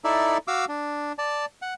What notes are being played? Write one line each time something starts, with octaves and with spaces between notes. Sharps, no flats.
D#4 E4 A4 D5 E5
F#4 F5 D6 E6
D4
D5 A5
F#5